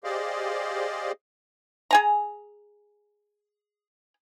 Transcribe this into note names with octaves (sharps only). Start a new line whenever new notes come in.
G4 G#4 C5 D5 D#5 F5
G#4 G#5 A#5